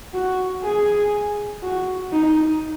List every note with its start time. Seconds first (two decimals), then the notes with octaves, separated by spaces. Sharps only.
0.14 F#4
0.64 G#4
1.63 F#4
2.13 D#4